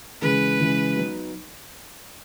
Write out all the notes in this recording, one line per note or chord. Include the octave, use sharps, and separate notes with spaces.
C#3 E3 G#3 B4
C#3 E3 G#3
F#3 B3 D#4